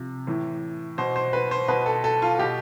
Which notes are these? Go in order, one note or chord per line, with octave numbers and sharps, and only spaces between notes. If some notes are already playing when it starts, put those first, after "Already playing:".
Already playing: C3 F3
A2 E3
B2 C5
C5
B4
C5
B2 B4
A4
A4
F4
B2 G4